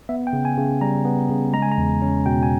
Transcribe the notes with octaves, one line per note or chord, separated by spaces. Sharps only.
B3 E5
G5
C#3
G#5
C#3
G3 A#5
B3
C#3
G#3 A#5
G#5
A#5
E2
C#4
B2 G5
G#5